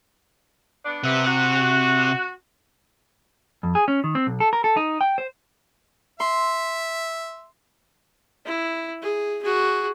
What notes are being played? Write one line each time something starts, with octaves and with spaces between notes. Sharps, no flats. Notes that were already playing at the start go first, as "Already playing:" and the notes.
B3 D4
C3 G3 B3 E5
F#4
F2
G#4
C#4
D#3
C4
B1
A4
A#4
A4
D#4
G5
C5
E5 C6
E4
G#4
F#4 G#4